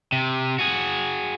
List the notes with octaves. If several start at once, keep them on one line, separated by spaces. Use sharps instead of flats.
C3
F#4 G#4